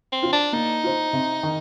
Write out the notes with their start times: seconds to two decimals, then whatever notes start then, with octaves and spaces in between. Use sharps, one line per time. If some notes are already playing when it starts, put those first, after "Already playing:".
0.12 C4
0.23 F4 C5
0.32 D4
0.53 A#3 D#4
0.84 F4 C5
1.13 C3
1.43 D#3